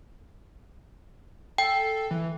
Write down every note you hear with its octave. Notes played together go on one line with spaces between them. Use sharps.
A4 G5
E3